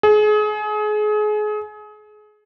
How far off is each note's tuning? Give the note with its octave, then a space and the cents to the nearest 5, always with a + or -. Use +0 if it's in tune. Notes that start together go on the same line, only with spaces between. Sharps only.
G#4 +30